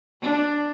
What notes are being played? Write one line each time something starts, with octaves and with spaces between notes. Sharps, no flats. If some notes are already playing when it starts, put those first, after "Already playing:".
D4